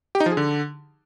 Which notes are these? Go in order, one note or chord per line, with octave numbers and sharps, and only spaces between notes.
G4
D#4
F3
G#4
D3